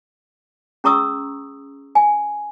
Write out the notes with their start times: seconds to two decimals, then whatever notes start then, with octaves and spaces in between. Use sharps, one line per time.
0.84 C#4 G#4 A#5 C#6 D#6 E6
1.95 G#5